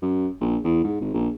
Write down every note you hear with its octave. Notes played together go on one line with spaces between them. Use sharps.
F#2
A#1
E2
G#2
G#1
A#1